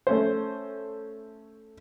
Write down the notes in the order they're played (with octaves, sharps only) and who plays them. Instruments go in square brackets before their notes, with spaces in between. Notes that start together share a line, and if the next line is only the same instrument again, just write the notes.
[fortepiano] A3 C#4 C5